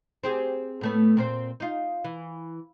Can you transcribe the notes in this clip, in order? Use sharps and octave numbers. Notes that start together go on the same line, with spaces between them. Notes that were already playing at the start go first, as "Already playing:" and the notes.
C4 G4 G#4
A2 A3 B3
A#2 C4 C5
D#4 F4
E3